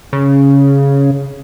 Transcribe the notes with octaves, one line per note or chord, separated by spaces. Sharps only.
C#3